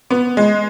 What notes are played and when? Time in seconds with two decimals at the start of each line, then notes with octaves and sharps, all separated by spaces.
0.11 B3
0.37 G#3